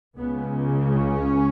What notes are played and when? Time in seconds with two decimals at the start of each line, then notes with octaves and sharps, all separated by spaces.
0.17 C#2 C#3 B3
0.90 C#4